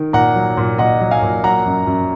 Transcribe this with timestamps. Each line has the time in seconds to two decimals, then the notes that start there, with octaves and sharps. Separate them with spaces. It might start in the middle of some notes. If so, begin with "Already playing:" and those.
Already playing: D#3
0.13 A#2 F#5 A#5
0.35 F#3
0.57 A#2
0.78 A#2 D#5 F#5
1.01 F#3
1.11 F5 G#5
1.22 A#2
1.44 F#3 F#5 A#5
1.66 F#2
1.87 F#2